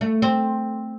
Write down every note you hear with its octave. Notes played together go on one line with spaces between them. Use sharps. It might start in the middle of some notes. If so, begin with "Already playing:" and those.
A3
C4